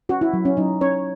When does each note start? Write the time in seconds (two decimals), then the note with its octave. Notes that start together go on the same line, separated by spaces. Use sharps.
0.09 C#4 F#4
0.21 E4
0.33 F#3
0.45 C#4
0.57 F#3 D#4
0.81 C#4 C#5